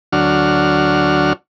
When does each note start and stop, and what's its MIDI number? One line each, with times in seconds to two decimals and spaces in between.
0.13 1.33 38
0.13 1.33 54
0.13 1.33 62
0.13 1.33 66
0.13 1.33 89